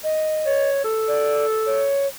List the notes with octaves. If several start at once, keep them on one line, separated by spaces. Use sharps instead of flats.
D#5
C#5
A4
D5
C#5